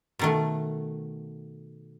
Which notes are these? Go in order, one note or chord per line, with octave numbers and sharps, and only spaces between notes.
B2 D#3 A3